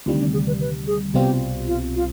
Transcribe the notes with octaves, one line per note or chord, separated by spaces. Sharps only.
D2 C3 D#3 G3 F4
D4
G#4
B4
B4
G#4
C2 B2 G3 C4 F4 G4
F4
F4